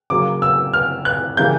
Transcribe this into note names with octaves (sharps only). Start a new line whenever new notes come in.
C#3 F#3 A#3 D6
E6
F6
F#6
C#3 E3 G3 A#3 G6